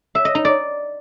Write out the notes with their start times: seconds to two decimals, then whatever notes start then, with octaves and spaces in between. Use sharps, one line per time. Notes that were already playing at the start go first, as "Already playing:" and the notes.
0.15 E5
0.25 D#5
0.35 D#4
0.45 D5